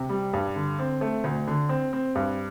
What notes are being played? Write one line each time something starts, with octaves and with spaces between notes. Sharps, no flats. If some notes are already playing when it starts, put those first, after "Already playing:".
Already playing: C3
G3
G2
D3
C4
A3
D2
D3
C4
C4
G2